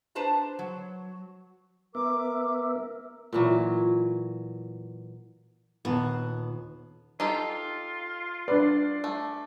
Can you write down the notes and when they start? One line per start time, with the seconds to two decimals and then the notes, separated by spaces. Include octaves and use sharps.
0.15 D4 B4 C5 A5 A#5
0.59 F#3
1.95 B3 A#4 E5 D6
3.33 A#2 E3 F#3
5.85 D#1 B3 A5 C7
7.20 D#4 F4 G4 A4
8.48 D4 B4 D5
9.04 A3